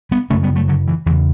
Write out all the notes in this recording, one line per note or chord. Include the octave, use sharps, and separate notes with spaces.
G3 B3
F#2 C#3 A3 C#4
G3 B3
F#3 A3
D3 F#3
E3
E2 C#3 E3